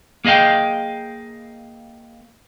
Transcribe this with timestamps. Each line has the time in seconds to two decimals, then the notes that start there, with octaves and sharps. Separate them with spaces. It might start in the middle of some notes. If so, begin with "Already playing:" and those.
0.25 A#3 G#4 D#5 F5 G5